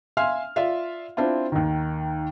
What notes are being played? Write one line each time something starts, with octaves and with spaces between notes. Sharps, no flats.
E5 F5 G#5 C6 F6
F4 D5 E5 F5
C4 D4 E4 F4
D#2 D#3